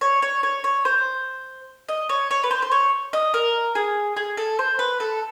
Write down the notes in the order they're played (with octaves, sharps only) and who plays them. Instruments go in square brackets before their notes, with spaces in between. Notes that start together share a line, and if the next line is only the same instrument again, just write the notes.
[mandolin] C#5
C#5
C#5
C#5
C5
D#5
C#5
C#5
B4
C5
C5
C#5
D#5
A#4
G#4
G#4
A4
C5
B4
A4